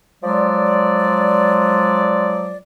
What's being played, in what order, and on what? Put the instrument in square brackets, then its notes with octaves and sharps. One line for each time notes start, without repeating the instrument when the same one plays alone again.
[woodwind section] F3 F#3 G#3 D5